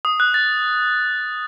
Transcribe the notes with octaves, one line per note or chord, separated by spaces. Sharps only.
D#6
F#6
A6